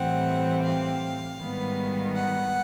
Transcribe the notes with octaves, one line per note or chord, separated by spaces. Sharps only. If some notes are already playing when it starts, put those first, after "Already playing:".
Already playing: A2 E3 G3 C4 F#5
F5
G#2 D#3 G3 B3
F#5